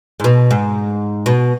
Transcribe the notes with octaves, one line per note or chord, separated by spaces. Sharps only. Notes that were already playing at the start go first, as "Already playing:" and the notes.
G#2
B2
G#2
B2